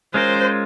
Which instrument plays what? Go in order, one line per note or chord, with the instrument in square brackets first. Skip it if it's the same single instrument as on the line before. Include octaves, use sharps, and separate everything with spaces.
[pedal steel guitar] G#3 C#4 F4 A#4 [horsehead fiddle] C5